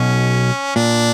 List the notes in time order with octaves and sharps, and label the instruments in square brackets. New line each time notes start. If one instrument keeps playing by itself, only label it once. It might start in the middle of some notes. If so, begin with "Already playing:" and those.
Already playing: [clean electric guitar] B1 B2 [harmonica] C#4
[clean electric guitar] A#2 [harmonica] D4